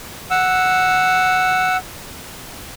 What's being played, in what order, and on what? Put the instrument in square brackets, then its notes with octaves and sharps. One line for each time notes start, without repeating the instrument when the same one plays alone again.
[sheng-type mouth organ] F#5 E6